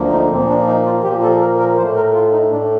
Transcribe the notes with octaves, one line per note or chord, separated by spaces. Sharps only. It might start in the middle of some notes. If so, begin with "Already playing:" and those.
Already playing: D2 D3 F3 A#3
D#4
A#2 F3 A#3 C4
D4
D#4
F4
A#2 F3 A#3 G4
A4
A#4
A#4
A2 A3 C5
A#4
F4
D#4
A2 A3 D4